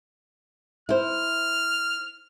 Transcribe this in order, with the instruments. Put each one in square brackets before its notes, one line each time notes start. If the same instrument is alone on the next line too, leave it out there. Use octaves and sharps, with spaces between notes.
[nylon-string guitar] E4 C5 [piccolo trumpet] F6